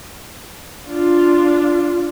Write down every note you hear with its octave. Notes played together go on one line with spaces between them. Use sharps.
D4 F4